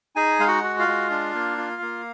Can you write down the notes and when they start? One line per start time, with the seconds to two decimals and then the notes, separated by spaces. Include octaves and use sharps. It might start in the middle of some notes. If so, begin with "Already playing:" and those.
0.16 D#4 G#4 G#5
0.40 G#3 F5
0.47 F#4 F#5
0.63 F#4
0.79 F4 F5
0.88 G#3
1.10 D4
1.35 A#3
1.58 F4
1.82 A#3